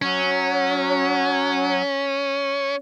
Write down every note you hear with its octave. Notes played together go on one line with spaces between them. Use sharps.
F#3 C#4